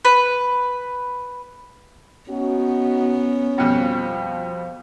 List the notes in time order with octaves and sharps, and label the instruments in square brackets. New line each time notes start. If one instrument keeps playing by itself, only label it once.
[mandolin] B4
[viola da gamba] B3 [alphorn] C#4 [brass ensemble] D#4 F#4
[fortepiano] F2 B2 G3 [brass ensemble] F3